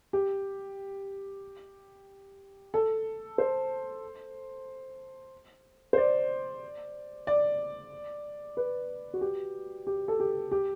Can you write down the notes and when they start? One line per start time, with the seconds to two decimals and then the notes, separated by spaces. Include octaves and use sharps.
0.13 G4
2.74 A4
3.38 C5
5.93 C5
5.98 D5
7.27 D5
8.57 B4
9.14 F#4
9.21 G4
9.87 G4
10.08 A4
10.20 G4
10.52 G4